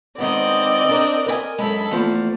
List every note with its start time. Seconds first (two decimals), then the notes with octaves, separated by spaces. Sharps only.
0.18 D#3 G#3 B3 C4 D5 D#5
0.89 D4 A#4
1.26 A#4 B4 G#5
1.58 F#2 G#3 A4 B5
1.91 E2 F3 A3 A#3